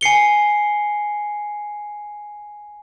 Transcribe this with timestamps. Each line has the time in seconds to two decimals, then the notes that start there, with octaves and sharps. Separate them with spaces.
0.01 G#5 C7 C#7 G7